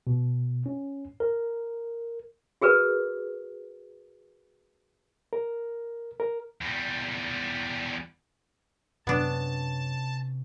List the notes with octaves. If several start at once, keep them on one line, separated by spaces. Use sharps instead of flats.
B2
C#4
A#4
F#4 G#4 A#4 B4
A#4
A#4
E2 G3
F#2 C3 B3 C#4 D4 A5